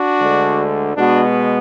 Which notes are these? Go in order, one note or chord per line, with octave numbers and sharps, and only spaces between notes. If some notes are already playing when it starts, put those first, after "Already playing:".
Already playing: D4 F#4
D2 D3 G#3
B2 G#3 B3 D4 F#4